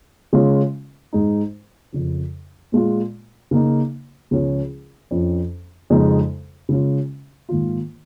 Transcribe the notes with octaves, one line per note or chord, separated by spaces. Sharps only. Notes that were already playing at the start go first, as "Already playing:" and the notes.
C#3 G#3 C#4 F4
G#2 G#3 D#4
F2 C#3 F3
A#2 G#3 F4
C#3 A#3 D#4
C#2 C#3 F3 G#3 C#4
F2 F3 C#4
F2 C#3 G#3 D#4
C#3 G#3 C#4 F4
G#2 D#3 A#3 F4